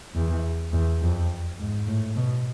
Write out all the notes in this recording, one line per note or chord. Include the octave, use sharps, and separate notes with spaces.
E2
E2
F2
G#2
A2
B2